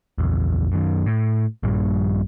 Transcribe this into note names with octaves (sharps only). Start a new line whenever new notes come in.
A#1 E2
F#2 D#3
A2
A#1 G2 A#2 G3